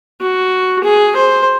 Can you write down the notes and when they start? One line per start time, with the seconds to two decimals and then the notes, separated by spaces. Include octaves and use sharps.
0.21 F#4
0.84 G#4
1.16 C5